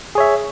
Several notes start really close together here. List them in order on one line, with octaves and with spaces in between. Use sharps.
G#4 C#5 E5